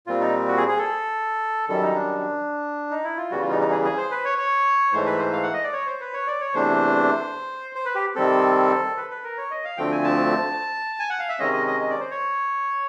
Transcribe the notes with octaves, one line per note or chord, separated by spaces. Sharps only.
A#2 G3 C4 F4
D#4
F#4
G#4
G#4
A4
F#2 D#3 G3 A4
D#4
D4
D#4
E4
F4
E2 C#3 E3 G3 F#4
F4
D#4
D#4
G#4
G#4
C5
B4
C#5
C#5
G#2 E3 A3 C5
B4
C5
F5
F#5
D#5
D5
C#5
C5
B4
C#5
D5
C#5
E2 C3 E3 A3 D4 C5
C5
B4
G4
C3 D#3 G3 C4 A4
B4
B4
A#4
C#5
D#5
F5
D2 D3 F3 A3 C4 G5
G#5
A5
G#5
F#5
F5
E5
C3 D#3 G#3 C#4 D#5
D#5
D#5
D#5
D5
C5
C#5